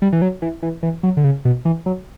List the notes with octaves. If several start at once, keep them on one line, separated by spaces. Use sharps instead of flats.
G3
E3
F#3
E3
E3
E3
F#3
D3
C#3
B2
E3
F#3